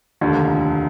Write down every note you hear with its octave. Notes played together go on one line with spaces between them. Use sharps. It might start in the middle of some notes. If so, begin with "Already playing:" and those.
F1 D#2 D3